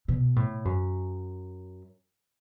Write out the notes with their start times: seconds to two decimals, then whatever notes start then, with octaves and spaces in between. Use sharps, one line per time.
0.08 B2
0.36 A2
0.65 F#2